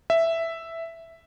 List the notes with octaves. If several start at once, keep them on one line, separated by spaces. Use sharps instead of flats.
E5